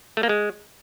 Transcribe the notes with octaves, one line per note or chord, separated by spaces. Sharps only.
A3
A#3
G#3